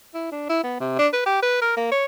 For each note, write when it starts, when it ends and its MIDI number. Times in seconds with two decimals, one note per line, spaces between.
0.15 0.30 64
0.32 0.48 62
0.49 0.61 64
0.64 0.75 59
0.80 0.96 48
0.99 1.08 62
1.13 1.24 71
1.26 1.40 67
1.42 1.58 71
1.62 1.73 70
1.77 1.90 58
1.92 2.05 73